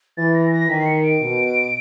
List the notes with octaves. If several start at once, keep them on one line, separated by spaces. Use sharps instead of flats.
E3 A6
A#6
A#6
D#3 B6
C7
C#7
D7
B2